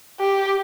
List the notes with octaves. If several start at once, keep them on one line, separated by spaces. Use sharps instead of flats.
G4